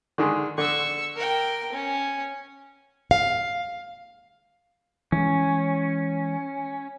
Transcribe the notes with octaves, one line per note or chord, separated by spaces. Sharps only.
D3 D#3 G#3
D3 C#6 E6
A#4 G5
C#4
F5
E3 G#3 C#4